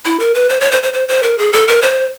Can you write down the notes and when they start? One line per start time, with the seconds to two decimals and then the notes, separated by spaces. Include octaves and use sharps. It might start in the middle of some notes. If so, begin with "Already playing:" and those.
0.05 E4
0.19 A#4
0.34 B4
0.49 C5
0.60 C#5
0.71 C5
0.83 C5
0.93 C5
1.08 C5
1.23 A#4
1.38 G#4
1.53 A4
1.68 A#4
1.82 C5